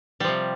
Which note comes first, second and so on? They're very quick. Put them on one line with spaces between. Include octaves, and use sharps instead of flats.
G3 F3 C3